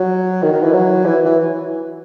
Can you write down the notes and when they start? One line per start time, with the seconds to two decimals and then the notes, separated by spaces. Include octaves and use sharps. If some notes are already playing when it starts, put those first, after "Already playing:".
Already playing: F#3
0.42 D#3
0.53 D#3
0.63 E3
0.73 F#3
1.05 E3
1.26 E3